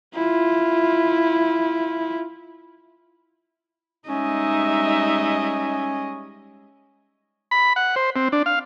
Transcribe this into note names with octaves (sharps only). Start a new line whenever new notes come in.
E4 F4
G3 G#3 C#4 D#4 D#5 E5
B5
F#5
C5
C4
D4
F5